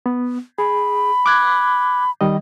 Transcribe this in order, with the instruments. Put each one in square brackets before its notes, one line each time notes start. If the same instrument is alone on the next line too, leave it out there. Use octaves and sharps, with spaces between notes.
[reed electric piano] B3
[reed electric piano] G#4 [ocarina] B5
[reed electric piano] D6 F#6 G#6
D#3 G3 D#5